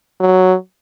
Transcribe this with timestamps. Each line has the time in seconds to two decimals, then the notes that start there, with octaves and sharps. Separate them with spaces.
0.20 F#3